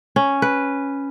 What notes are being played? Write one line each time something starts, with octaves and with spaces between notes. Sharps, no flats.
C#4
B4